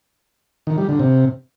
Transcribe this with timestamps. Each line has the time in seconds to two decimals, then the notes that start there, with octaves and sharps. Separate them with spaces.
0.67 D#3
0.78 G3
0.89 D3
1.00 C3